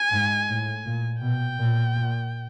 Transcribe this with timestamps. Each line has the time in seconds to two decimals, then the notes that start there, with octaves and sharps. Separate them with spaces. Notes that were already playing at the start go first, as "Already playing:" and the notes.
Already playing: G#5
0.12 G#2
0.48 A2
0.85 A#2
1.22 B2 G5
1.58 A#2
1.95 A#2